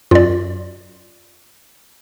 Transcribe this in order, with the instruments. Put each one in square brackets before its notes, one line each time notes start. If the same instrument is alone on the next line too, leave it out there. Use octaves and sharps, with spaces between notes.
[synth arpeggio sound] F#2 [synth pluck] F4 D5